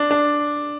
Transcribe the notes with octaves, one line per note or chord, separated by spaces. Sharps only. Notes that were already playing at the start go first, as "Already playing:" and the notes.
Already playing: D4
D4